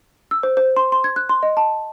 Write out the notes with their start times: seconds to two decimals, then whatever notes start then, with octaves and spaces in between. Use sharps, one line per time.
0.31 E6
0.43 C5
0.57 C5
0.77 C6
0.92 C6
1.04 G#6
1.16 F#6
1.29 C6
1.43 D#5
1.57 A5